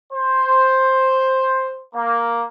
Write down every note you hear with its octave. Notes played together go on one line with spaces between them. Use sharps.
C5
A#3